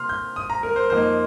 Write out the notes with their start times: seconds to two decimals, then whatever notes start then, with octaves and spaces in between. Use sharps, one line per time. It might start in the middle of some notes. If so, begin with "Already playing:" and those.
Already playing: C3 A#3 C6 F6
0.09 G6
0.36 D#6
0.50 A#5
0.63 A#4
0.76 C5
0.90 F2 F3 A#3 D#4 C5